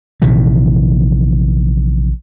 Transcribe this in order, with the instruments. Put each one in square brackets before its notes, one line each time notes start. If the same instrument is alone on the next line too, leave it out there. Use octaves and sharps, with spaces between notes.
[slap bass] A#1 C3 D#3 E3